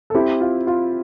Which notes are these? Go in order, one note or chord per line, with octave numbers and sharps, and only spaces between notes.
A4
C4 E4 G4
F4
F4